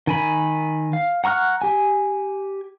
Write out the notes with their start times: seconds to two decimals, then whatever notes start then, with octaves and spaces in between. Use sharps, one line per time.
0.07 D#3 G#5 B5
0.93 F5
1.24 F#5 A#5 C#6 F6 F#6
1.62 G4 G#5